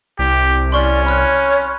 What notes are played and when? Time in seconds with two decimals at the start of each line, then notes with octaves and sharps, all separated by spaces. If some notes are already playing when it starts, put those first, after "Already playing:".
0.19 C2 G4
0.72 C#4 D5 C6 C#6 F6
1.07 C#5 B5 F6 F#6